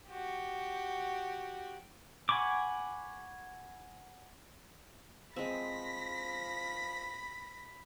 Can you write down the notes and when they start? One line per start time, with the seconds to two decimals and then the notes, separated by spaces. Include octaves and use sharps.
0.10 F#4 G4
2.29 F#5 G#5 B5 C#6 D6
5.36 F3 G#3 C4 B5 A#6 B6